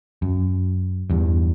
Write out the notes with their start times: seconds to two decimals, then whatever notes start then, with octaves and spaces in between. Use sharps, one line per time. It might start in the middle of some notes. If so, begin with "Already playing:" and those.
0.22 F#2
1.10 E2 G2